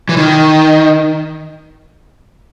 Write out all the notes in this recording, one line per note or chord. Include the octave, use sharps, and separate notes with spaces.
E3
D#3